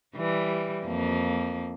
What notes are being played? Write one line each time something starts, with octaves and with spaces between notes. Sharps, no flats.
E3 G3
F2 F3 A#3